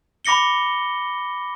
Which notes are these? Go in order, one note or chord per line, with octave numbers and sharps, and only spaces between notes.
B5 D6 A#6 C#7 G7